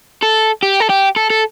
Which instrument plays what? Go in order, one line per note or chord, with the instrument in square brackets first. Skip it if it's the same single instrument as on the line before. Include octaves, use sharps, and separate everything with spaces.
[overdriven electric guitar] A4
G4
A4
G4
A4
A4